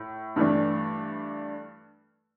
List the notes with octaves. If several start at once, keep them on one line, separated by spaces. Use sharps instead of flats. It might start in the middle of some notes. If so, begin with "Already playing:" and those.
Already playing: A2
G2 E3 A3 D4